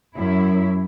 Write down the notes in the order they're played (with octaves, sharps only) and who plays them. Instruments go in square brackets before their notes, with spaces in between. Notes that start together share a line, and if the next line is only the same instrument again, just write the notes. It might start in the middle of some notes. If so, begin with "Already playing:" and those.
[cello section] F#2 E4